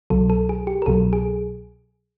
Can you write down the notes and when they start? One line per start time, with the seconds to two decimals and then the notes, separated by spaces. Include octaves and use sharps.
0.10 C2 B2 F#3 A4
0.30 A4
0.49 G#4
0.67 G4
0.82 A#4
0.86 C2 B2 F#3 A4
1.13 G#4